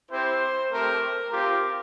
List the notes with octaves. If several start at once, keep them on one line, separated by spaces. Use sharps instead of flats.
C4 E4 G4 C5
A3 C4 G4 A#4
C4 F4 G4